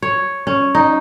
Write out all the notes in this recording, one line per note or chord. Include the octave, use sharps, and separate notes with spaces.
C#5
C#4
D#4